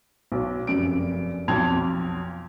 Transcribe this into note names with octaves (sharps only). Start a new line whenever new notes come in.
B1
F1 F#2 D7
B1 F2 A5 C6 G#6 F7